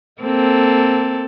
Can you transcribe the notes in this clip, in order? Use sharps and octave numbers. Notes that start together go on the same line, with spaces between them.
A#3 C4 A4